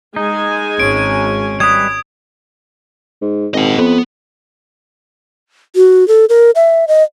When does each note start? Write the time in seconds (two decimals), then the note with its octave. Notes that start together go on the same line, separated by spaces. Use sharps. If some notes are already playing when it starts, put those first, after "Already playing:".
0.16 G#3 D#4 G#5
0.80 G#1 C#4 D7
1.60 G3 G#3 B4 D#6 G#6
3.22 G#2
3.54 G#1 D#5 F#5
3.78 F2 B3
5.76 F#4
6.08 A4
6.29 A#4
6.55 E5
6.88 D#5